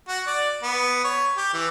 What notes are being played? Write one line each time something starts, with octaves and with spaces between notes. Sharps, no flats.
F#4
D5
B3
C#5
G4
E3